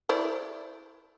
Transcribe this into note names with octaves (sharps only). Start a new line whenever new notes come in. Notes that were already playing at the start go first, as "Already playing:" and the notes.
E4 C5 D5